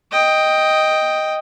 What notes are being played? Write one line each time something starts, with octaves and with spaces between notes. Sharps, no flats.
D#5 G5